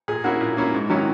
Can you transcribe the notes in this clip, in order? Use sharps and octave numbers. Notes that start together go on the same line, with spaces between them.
A#2 G#4
A#3 C#4 E4 F#4
A#2
A#3 C#4 E4
G#2
D#3 F#3 C#4 E4